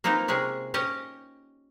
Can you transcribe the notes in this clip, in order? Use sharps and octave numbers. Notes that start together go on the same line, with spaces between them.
A#3 C4 D#4 F4 A#4 B4
C3 G#3 C#4 G#4
C#4 G4 D#5